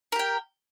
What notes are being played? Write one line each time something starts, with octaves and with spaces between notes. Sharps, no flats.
G4 A#4 G5